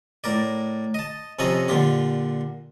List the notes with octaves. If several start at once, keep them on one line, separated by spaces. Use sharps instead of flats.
A2 A#4 D5
D#5 A5
F2 C3 C#4 A4 D#5 A#5
A#2 D3 F4 G4